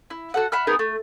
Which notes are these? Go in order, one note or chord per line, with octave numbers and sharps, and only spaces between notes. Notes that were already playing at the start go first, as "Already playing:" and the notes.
E4
F#4 A4 F#5
E5 F#5 B5 F6
B3 D#4 G#4 A#4
A3